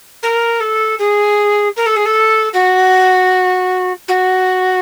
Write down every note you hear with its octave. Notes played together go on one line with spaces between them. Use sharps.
A#4
A4
G#4
A#4
A4
G#4
A4
F#4
F#4